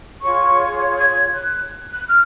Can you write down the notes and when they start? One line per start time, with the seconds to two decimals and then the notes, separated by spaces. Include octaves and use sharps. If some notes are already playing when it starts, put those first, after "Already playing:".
0.21 F4 G#4 C#5 C#6
0.96 G#6
1.34 F#6
1.90 F#6
2.08 F6